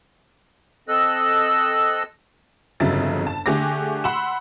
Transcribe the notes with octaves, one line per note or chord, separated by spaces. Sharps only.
C4 A4 D#5 E6 F#6
G1 F2 C#3 F#3 E5 A6
A5
D3 A3 G4 G#4 D6 A#6
F#5 B5 C6 E6 E7